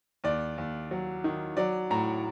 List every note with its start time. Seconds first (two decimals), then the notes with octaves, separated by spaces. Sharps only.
0.24 D#2 D5
0.58 D#2
0.91 F#3
1.24 D#3
1.57 F#3 D5
1.91 A2 A#5